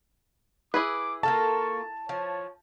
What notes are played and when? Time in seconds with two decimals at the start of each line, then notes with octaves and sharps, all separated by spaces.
0.74 E4 G#4 B4 D6
1.23 A#3 F4 A4 A5 C#6
2.09 F3 C#5